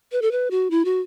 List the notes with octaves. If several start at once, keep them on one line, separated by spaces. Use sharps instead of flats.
B4
A4
B4
F#4
E4
F#4